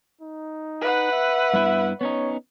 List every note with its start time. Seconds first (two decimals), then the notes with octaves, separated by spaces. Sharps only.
0.21 D#4
0.81 B4 F#5
1.12 E5
1.54 G2 B3 E4
2.01 B3 C#4 D#4 C#5